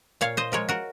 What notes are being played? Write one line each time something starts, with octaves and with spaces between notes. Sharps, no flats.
A#2 C#5 F5
C5 D#5
F3 G#3 A#4 C#5
F#4 A#4